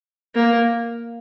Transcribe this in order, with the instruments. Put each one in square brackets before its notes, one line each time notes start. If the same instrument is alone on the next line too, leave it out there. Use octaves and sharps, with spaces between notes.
[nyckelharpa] A#3